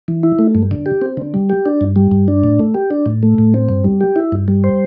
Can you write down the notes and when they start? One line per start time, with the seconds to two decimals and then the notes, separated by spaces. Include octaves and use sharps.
0.08 E3
0.23 E4
0.39 A3
0.55 G2
0.71 D3
0.86 G4
1.02 C4
1.17 D3
1.34 G3
1.50 G4
1.66 D4
1.81 G2
1.96 G3
2.12 G2
2.28 D4
2.44 A2
2.59 A3
2.74 G4
2.91 D4
3.06 A2
3.23 A3
3.38 A2
3.54 C4
3.69 G2
3.84 G3
4.01 G4
4.16 E4
4.32 G2
4.48 G3
4.64 C5